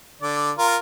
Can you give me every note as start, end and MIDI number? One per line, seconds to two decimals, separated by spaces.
0.22 0.52 50
0.22 0.52 74
0.58 0.77 65
0.58 0.77 70